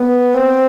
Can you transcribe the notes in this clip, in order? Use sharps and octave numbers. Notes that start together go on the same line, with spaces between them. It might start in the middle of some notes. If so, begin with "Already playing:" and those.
Already playing: B3
C4